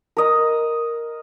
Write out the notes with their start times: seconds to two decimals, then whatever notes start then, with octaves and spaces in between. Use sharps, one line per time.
0.17 A#4 D#5